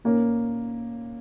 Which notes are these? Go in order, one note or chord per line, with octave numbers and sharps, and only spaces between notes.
A#2 A#3 C#4